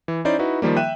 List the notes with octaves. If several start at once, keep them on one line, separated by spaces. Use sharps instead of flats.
E3
C#4 D#4 E4 C5 D5
D#4 E4 F#4 B4
D#3 F3 G3 A#3
E5 G5 F#6 D#7 E7